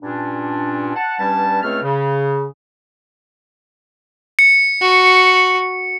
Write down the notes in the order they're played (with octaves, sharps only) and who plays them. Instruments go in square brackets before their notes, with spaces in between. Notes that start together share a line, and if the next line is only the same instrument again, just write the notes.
[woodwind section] G2 A#2 C#4 D4
F#5 A5
G2 G3 C#4 B4 A5
C#2 A3 C4 C#5 F6
C#3
[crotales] C#7
[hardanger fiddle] F#4